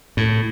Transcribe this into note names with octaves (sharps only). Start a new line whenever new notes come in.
A2